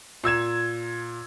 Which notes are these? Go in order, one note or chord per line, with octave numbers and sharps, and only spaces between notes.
A#2 E6 G#6 E7